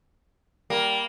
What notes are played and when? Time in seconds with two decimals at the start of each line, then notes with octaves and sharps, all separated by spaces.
0.70 G3 A#3